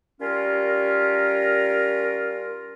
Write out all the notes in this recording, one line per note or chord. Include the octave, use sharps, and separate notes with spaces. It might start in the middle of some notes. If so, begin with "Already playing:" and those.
G3 C#4 F4 A#4